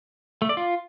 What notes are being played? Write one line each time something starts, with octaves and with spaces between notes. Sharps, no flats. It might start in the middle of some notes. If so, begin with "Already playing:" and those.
A3
D5
F4